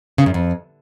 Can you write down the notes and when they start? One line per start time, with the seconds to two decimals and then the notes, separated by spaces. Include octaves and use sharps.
0.18 C#3
0.26 F#2
0.34 F2